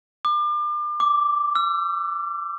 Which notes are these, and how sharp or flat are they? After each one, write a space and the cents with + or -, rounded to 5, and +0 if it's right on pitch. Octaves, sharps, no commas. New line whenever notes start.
D6 +35
D6 -5
E6 +40